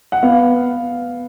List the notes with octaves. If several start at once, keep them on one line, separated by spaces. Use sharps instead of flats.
F#5
B3 F5